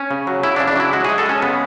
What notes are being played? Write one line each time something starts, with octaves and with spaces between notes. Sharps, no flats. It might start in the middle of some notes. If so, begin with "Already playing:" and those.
Already playing: C#4
C#3
F#3
C#3 E4
D4
C#3
D4
F#3 E4
G#3 F#4
G#3 G#4
A4
G#3 C#4
C#3 B3